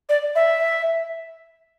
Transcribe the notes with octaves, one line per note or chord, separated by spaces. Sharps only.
D5
E5